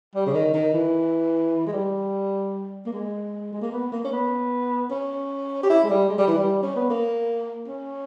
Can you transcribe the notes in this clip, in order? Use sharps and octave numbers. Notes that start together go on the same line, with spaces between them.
G3
C#3
D#3
D#3
E3
G#3
G3
A#3
G#3
G#3
A#3
B3
A#3
C#4
B3
C#4
G4
E4
G#3
G3
G#3
G3
E3
G3
C#4
B3
A#3
C#4